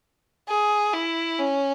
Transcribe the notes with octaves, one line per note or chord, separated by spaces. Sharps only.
G#4
E4
C#4